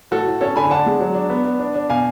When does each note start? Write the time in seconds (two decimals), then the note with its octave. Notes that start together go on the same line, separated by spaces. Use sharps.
0.11 A2 F#4 A4
0.27 A2
0.41 C#4 A4 C#5
0.56 D3 G#5 B5
0.70 D4 F#5 A5
0.86 G#3
1.00 F#3
1.15 D4
1.30 B3
1.45 B3
1.60 D4
1.75 D4
1.89 B2 F5 G#5